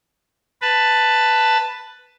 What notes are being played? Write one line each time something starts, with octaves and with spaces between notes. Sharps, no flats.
B4 A5